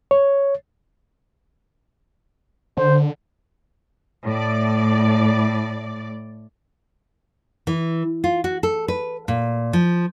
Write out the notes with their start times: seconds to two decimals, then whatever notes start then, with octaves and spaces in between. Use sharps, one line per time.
0.11 C#5
2.77 D3 C5
4.26 A2 D5
7.67 E3
8.24 F4
8.44 F#4
8.63 A4
8.88 B4
9.28 A#2
9.73 F3